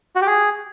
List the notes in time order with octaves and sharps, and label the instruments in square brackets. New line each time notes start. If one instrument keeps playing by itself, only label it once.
[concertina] F#4
G4
G#4